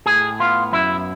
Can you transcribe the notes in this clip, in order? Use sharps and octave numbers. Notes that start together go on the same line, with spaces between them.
A2 G#4
B3 F4
F#2 E4